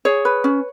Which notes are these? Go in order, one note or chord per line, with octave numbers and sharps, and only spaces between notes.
G#4 C#5
B4
C#4